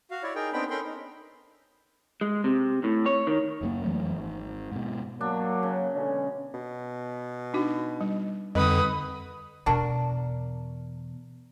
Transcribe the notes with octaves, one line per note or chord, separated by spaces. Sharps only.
F#4 F5
E4 C#5 D5
D#4 G#4 A#4 G5
B3 C4 D4 D#4 G5 B5
C#4 A4 A#4 G5 B5 C6
D#4
G#3
C3
A2
C#5
D#3
F#1 F#2 A#2 A#3
F2 E3 F#3 A3
G#1
G#2 B2
F#3 A#3 D4
C#3
B2 D3 G#3 C#4
B2
D4 D#4 F#4
G3
F2 D3 G3 D#4 B4 D#6
E2 B2 D4 F#4 A#4